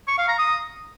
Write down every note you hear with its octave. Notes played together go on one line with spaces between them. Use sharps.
C#6
F5
A#5
D#6